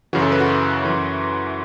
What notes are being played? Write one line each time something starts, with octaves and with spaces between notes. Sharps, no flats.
F#2 C#3 E3 F#4
A4
B4
F#4
F#2 E3